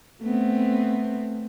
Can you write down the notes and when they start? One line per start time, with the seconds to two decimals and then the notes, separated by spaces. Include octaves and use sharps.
0.22 A3 B3 C4